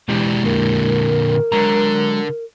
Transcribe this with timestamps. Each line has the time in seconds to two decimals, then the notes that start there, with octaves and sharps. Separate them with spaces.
0.09 B2 E3 G#3 D4 E4 G4
0.44 A#2 D3 A#4
1.52 D3 F#3 G#3 A#5